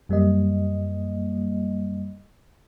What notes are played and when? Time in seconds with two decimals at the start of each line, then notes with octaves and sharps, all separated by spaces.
0.09 F#2 G3 A#3 D#5